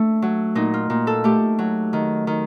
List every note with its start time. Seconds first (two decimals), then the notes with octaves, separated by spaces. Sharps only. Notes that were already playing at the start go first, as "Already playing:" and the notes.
Already playing: A3 D4
0.22 F#3
0.55 A#2 D#4
0.74 F4
0.90 A#2
1.07 A4
1.24 A3 G4
1.59 F#3
1.93 D#3
2.27 D#3